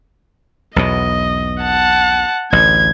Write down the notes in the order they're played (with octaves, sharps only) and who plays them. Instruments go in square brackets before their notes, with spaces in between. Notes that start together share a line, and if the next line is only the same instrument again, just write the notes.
[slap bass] B1 E2 B2 [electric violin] D#5
[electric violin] F#5 A5
[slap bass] A1 D2 [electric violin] G#6